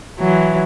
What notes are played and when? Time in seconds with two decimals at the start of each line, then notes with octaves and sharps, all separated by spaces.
0.19 E3 F#3